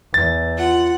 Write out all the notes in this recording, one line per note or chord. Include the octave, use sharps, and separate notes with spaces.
E2 A6
F4 F#5